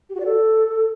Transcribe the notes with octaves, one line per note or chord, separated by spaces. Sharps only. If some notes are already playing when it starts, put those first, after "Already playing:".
G4
F#4
D5
A4